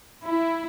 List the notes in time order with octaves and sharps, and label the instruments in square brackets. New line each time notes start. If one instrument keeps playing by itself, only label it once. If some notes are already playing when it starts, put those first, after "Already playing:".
[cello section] E4